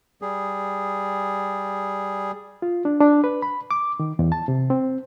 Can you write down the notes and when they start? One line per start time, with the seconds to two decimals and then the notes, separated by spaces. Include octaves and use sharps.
0.22 G3 G#4
2.62 F4
2.85 D4
3.00 D4
3.24 B4
3.42 B5
3.71 D6
4.00 D#3
4.19 E2
4.32 A5
4.48 C3
4.70 C4